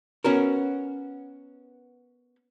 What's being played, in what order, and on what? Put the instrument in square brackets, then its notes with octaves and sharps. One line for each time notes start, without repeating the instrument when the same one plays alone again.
[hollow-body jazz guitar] B3 C#4 F#4 A#4